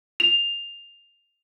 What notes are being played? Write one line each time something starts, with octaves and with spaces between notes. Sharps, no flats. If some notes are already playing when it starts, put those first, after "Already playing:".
F7